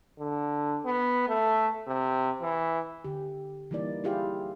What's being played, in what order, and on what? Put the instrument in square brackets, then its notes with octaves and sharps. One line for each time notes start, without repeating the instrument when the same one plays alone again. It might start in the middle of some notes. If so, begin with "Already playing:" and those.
[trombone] D3
B3
A3
C3
E3
[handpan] D3 G4
E3 G3 A#3 D#4 D5
E4 F4 G4 G#4 F5